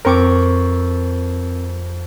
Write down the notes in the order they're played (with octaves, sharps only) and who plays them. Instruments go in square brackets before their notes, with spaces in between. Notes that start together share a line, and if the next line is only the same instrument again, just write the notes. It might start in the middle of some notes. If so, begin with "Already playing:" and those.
[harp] F2 C#6 D6 [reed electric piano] C4 A#4